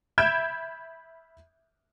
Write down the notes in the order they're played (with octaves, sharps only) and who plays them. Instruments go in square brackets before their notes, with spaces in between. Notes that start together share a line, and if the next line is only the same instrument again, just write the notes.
[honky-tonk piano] E5 B5 G6 G#6 D7 E7